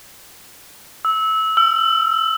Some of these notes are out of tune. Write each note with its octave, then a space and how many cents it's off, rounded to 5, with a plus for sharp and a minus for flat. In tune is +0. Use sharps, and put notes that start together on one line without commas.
E6 -20
E6 +35